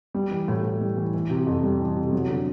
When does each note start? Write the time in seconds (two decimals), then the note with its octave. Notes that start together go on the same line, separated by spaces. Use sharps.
0.14 G3
0.31 E3
0.48 A2
0.64 A2
0.81 G3
0.97 E3
1.14 E3
1.30 C3
1.47 F2
1.63 G3
1.80 E3
1.97 C3
2.13 F#3
2.30 D3